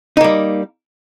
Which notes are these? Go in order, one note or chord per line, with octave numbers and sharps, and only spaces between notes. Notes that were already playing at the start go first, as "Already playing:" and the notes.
G3 A#3 D#4